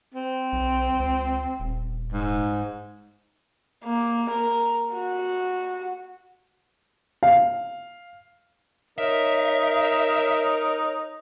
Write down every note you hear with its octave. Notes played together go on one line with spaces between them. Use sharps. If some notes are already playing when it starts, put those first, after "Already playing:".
C4
B1
C#2
D#1
G#2
A#3
A#4
F#4
F5
D#4 A#4 C#5 E5